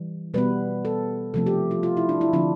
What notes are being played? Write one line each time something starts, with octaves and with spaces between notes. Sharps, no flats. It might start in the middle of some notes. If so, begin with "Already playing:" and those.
Already playing: E3 G3
B2 G3 B3 B4
A4
C3 F3 A3 C4 A4
G4
F4
F4
E4
D4
E4
D3 F3 C4 D4